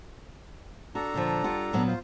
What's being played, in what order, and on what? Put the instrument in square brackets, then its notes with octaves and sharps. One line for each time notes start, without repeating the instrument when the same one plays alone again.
[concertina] D4 A4 A#5 [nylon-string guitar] F#4
[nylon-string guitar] A#2 D3 F3
G3 F4 F#5
A#2 F#3 B3
[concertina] F4 C5